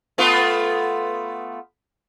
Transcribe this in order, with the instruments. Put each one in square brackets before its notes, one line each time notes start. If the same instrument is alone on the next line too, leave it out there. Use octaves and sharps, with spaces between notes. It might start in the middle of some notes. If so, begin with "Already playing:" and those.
[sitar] A3 B3 F4